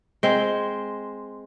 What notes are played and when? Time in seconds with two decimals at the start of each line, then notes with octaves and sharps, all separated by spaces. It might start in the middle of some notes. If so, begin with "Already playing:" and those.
0.23 G#3 C4